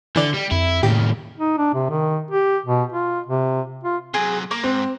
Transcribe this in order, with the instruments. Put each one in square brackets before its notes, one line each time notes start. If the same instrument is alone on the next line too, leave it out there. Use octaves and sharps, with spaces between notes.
[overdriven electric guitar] D3 [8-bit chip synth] E3 D5
[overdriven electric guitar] G3
[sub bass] F2 [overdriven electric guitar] E4
[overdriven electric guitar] D#2 C#3 [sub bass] A2 [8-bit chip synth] G4
[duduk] D#4
D4
C3
D#3
G4
B2
F4
C3
F4
[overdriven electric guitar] C3 F#3 [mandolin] G#4
[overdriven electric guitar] A#3 [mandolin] D6
[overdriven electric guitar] G#2 [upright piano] C4